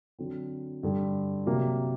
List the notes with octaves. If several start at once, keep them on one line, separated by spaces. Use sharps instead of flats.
D3 F#3 C4
G2 D3 G3
C3 F#3 A#3